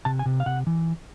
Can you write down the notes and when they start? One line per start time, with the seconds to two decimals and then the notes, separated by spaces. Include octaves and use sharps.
0.05 C3 A5
0.19 G#5
0.26 C3
0.40 F5
0.46 C3 F#5
0.67 E3